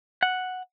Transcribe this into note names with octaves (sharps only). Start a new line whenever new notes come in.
F#5